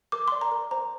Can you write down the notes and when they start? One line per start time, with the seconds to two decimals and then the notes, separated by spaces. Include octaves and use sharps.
0.12 A#4 D6
0.28 D5 C6
0.41 A#5
0.52 A#4
0.71 C5 A#5